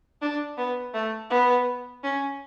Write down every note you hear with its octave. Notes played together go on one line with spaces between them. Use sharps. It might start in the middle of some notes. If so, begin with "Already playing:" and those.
D4
B3
A3
B3
C#4